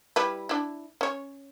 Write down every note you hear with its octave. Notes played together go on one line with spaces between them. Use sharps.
G3 E4 B4
D4 E4
C#4 C#5